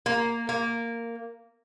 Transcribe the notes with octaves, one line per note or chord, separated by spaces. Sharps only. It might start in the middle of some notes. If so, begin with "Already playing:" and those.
A#3
A#3